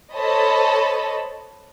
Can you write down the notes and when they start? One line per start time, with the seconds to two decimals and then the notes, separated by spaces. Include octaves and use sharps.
0.14 A4 C5 C#5 D#5 A5 B5